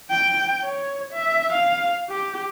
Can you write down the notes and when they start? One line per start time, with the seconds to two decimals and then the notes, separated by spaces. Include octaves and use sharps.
0.11 G5
0.64 C#5
1.13 E5
1.53 F5
2.10 G4